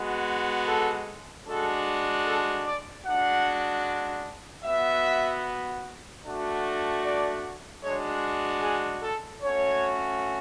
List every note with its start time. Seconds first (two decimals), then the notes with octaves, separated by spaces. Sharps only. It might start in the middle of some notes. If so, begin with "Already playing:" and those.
Already playing: G#3 B3 F#4
0.68 A4
1.47 G#3 D4 F#4 A4
2.26 A4
2.66 D5
3.06 G#3 D4 F#4 F#5
4.65 B3 F#4 E5
6.25 A3 D4 F#4
7.04 D5
7.83 G#3 D4 F#4 C#5
8.63 G#4
9.02 A4
9.42 A3 C#4 F#4 C#5